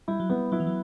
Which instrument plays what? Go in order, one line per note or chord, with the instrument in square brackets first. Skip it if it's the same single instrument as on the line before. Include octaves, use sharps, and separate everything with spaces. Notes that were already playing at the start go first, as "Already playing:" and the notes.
[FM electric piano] G3 [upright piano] E4
[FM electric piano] F#3
[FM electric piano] G3 [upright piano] B3
[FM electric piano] F#3 [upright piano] E4
[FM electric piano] E3
F#3